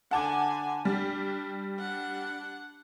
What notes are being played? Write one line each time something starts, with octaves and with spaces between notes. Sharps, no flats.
D3 F#5 G#5 A5 D6
G3 D4
D4 F#5